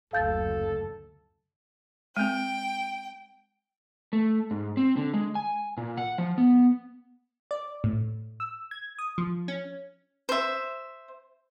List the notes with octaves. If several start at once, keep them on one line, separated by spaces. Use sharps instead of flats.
F#1 D2 A4 F5 G6 A6
G#3 C4 G5
A3
G#2
C4
D3
G#3
G#5
A#2
F#5
F3
B3
D5
A2
E6
G#6
D#6
F3
C#4
C5 E5